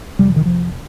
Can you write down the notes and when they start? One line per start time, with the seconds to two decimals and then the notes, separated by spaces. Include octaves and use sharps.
0.19 F1 F2 C3 G3
0.28 F3
0.36 D#3
0.46 F3